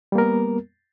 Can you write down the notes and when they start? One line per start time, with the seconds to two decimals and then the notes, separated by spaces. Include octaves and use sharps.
0.12 G3
0.15 A#3
0.18 A#4
0.21 B3